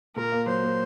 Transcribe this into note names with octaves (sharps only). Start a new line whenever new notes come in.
A#2 A#4
A#3
F#3 C5
A#3